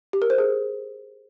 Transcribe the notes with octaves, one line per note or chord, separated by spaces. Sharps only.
G4
A#4
C5
G#4